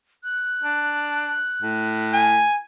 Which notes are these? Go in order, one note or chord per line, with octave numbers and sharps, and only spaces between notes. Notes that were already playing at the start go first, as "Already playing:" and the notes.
F#6
D4
A2
G#5